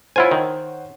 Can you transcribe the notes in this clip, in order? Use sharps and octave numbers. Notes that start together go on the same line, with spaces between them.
E4 F4 C5 C#5 F#5 G#5
D#3